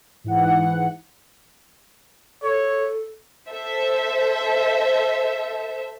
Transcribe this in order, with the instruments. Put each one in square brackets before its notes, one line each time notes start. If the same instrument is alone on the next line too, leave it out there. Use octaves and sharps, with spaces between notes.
[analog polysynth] G#2 E3 F#5
[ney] A4 [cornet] C#5
[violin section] A4 C5 E5